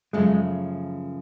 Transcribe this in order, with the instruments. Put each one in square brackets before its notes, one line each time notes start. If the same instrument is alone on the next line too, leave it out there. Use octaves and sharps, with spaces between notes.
[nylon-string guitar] F#2 C#3 F3 A3 C#4 [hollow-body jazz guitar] G#3